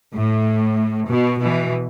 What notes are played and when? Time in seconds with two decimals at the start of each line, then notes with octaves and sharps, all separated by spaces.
0.14 A2
1.10 B2
1.41 B2 E3